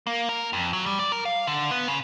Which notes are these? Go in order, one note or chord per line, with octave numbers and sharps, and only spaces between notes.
A#3
A#4
F2
F#3
G3
D5
A#4
F5
D3
B3
C#3